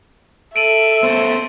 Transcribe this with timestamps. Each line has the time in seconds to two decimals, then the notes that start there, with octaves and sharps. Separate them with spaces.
0.56 A4 E5 D7 D#7 F#7
1.03 B3 C#4 A4 C5